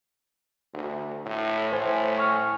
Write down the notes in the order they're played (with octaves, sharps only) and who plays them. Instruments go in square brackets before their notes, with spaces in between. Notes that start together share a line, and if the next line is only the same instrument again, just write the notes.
[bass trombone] D2
A2
[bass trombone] A2 [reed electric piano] C5 G#5
[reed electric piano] G#5 C#6 F6